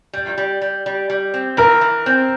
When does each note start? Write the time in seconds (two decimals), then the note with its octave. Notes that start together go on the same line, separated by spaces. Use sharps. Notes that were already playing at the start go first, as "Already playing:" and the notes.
0.13 G3
0.38 G3
0.62 G3
0.86 G3
1.10 G3
1.34 C4
1.57 E3 A#4
1.81 E3
2.06 C4